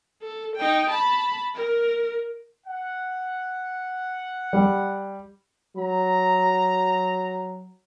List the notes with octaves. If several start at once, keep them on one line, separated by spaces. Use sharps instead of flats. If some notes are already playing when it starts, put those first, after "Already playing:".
A4
D#4 G5
A5 B5
A#4
F#5
G3
F#3 A#5